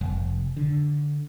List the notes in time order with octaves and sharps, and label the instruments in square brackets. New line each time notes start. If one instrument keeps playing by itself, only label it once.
[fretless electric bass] F1
D3